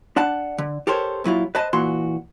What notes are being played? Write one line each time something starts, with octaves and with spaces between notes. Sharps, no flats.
D4 F#5 A5
D3
G4 A4 A#4 C5 C#5
A#2 F#3 E4 F4
B4 C5 D#5 A5
A#2 E3 F#4 C6